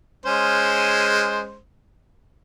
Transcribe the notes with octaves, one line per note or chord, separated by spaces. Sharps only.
G#3 C#4 C5